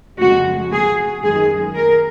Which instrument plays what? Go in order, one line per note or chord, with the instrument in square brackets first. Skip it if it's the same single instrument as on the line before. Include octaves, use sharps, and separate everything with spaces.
[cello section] F2 C#3 G#3 F#4
G#4
F#2 D#3 G#3 G#4
A#4